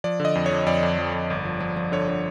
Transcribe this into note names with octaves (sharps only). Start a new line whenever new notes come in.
F3 D5
D3
D#5
F2
F3 C#5
F2 D5
F2
F3
F2
G1
F3
F3
F3
D3 C#5
D3